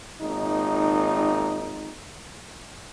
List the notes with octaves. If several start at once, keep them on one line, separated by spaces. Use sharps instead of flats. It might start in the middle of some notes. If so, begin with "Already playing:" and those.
G#1 A#2 D#4